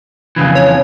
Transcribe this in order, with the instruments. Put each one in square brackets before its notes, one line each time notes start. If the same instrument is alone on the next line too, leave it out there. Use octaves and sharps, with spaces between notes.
[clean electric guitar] F2 C#3 E3
[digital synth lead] C#5